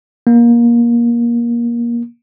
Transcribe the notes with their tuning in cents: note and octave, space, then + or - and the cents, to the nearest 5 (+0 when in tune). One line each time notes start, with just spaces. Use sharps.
A#3 +20